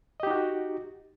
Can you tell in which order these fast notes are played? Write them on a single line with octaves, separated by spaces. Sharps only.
D#5 G4 D#4 F#4